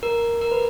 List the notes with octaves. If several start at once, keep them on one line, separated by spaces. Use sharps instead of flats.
A#4
A#4
B4